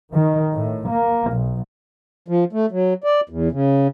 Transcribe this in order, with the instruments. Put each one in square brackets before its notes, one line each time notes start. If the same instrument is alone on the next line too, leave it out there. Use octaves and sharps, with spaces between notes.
[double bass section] D#3
A2
A#3
B1
[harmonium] F3
A3
F#3
D5
E2
C#3